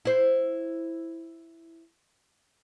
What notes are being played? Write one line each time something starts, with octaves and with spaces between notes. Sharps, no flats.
E4 C5